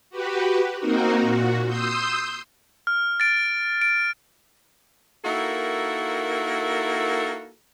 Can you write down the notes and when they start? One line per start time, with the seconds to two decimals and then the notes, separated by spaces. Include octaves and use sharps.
0.10 F#4 G4 B4
0.79 A#3 C4 D#4 F#4 A#4
1.21 A#2 F#4
1.66 C6 D#6 E6 G6
2.87 F6
3.20 A6 D7
3.82 D7
5.25 A#3 D#4 E4 F#4 A4 A#4